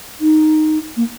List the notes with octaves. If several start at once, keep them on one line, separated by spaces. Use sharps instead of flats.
D#4
A#3